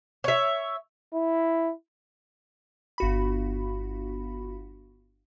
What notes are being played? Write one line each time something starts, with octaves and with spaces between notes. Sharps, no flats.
C#5 E5
E4
G1 F#4 B5